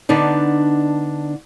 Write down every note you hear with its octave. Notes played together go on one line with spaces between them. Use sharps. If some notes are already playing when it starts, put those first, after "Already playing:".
D3 B3 D4 D#4